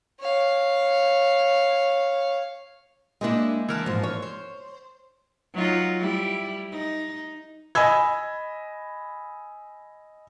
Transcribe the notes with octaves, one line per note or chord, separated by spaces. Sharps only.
C#5 F5
G#3 A#3 D4 E4 G4 D#5
E3 A#4 A5
G#2 F3
C#5
C5
F#3 D#4 F4
G3 E4
D#4
D#5 G#5 B5 E6 G#6